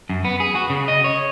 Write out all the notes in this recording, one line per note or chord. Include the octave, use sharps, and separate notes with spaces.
F#2
B3
G#4
F#4
C#3
D#5
C#5